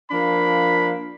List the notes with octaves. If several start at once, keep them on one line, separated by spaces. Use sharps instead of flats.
F3 A#3 D4 B5